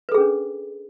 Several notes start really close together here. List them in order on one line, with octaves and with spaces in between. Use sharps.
B4 A4 G#4 C#4 D4